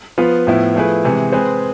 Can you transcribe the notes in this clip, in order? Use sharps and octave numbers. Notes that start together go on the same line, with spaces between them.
F3 B3 F4 B4
A2 F3 B3 E4
F3 A3 E4 G#4 B4
C3 E3 G#3
G#3 C4 G#4 B4